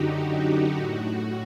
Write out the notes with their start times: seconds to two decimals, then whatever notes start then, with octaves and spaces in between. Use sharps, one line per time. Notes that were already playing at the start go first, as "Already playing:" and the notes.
Already playing: F#2 D3 D#4 F#4 G4
0.30 F#4
0.77 A2